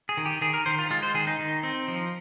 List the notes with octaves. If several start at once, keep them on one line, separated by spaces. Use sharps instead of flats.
G#4
D#3
G4
D#3 G#4
A#4
D#3 C5
F4
G#3 F4
C5
D#3 G#4
D#4
D#3
C4
F3